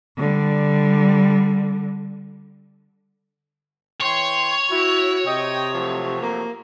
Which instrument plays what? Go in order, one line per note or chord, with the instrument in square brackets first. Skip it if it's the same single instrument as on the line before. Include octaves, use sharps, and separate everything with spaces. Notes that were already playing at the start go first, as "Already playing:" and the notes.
[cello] D3 G3
[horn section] E3 G5 C6 [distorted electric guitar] C#5
[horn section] E4 [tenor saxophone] F#4
[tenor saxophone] C3 [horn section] D#5 G5
[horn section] F3 F#3 A3
[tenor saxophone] A#3